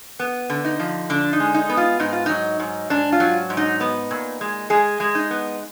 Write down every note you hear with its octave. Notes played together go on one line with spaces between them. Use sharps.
B3
D3
D#4
F3
D3 D4
D#4
G#3
D#4
B3
F4
G#2 D#4
F4
F#3 D#4
G#2
G#2 D4
F4
F#3
G#2
D#4
B3
A#2
G#3
G#3 G#4
G#3
D#4
B3